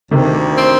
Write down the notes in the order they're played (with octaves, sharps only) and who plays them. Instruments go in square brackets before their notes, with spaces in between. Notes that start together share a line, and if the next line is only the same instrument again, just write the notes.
[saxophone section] D2 [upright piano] C3 D#3
[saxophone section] C4